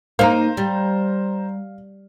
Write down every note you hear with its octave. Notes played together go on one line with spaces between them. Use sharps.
A#3 D#4 C5 F5 A#5
G3